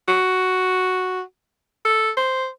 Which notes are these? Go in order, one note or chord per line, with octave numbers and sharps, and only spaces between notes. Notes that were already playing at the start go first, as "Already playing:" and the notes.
F#4
A4
C5